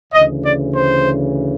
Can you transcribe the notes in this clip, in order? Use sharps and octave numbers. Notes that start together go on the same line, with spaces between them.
D2 C#3 E3 D#5
D5
C5